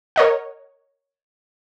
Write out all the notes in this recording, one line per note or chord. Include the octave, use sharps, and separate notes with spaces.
A#4 C#5 D#5 F#5